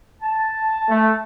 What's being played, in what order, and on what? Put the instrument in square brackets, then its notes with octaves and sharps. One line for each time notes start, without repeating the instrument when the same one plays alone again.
[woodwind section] A5
[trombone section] A3